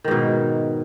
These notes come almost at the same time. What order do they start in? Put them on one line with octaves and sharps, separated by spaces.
D#3 G#2 B2